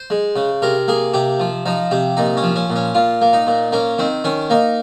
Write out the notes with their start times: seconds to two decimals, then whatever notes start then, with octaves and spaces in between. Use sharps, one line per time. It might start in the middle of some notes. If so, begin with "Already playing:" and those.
Already playing: C5
0.10 G#3
0.36 C#3
0.62 C3 A#4
0.88 A#3 G#4
1.14 C3 G4
1.40 F3
1.66 F3 D#4
1.91 C3 G4
2.17 A#2 D#4
2.37 C#4
2.43 F3
2.56 C#4
2.70 A#2
2.76 C#4
2.95 A#2 F4
3.21 A#3
3.33 D#4
3.47 A#2
3.72 A#3 C#4
3.98 D#3 C4
4.24 D#3 C#4
4.50 A#3 D#4